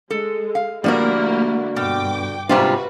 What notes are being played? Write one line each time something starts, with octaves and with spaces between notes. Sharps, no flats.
G#3 A4
F5
D3 F3 G3 A3 A#3 E4 F#4 A#4
G2 B2 G5 D6
G#2 C3 G3 D4 F4 F#4 B4